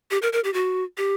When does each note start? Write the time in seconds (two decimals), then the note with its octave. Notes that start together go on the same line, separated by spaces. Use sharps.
0.11 G4
0.22 A#4
0.33 A#4
0.44 G4
0.54 F#4
0.97 G4